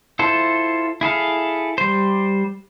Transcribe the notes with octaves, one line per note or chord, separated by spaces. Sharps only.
E4 F4 A4 C5
E4 G#4 A4 F5
G3 C5